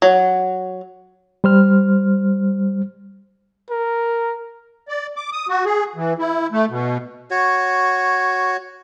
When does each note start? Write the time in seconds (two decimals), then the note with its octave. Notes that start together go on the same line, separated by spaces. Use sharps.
0.02 F#3
1.44 G3 C5 F6
3.70 A#4
4.88 D5
5.16 D6
5.32 D#6
5.49 F#4
5.65 G#4
5.96 E3
6.19 E4
6.52 A3
6.70 B2
7.31 F#4 C#5